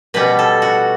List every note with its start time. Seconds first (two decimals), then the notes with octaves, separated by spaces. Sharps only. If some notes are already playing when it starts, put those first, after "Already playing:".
0.14 B2 G3 C#4 B4
0.39 A4
0.62 F#4